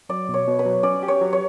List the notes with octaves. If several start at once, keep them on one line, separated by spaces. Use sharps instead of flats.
F#3 D5
B2 C#5
B2
B4
F#3
C#4 D5
G4
C#5
F#3
C#5